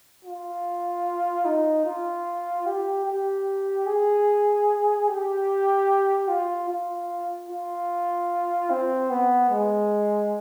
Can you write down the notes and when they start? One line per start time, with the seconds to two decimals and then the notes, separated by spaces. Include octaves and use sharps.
0.25 F4
1.45 D#4
1.85 F4
2.66 G4
3.06 G4
3.87 G#4
5.08 G4
6.28 F4
6.69 F4
7.49 F4
8.70 C4
9.10 B3
9.50 G#3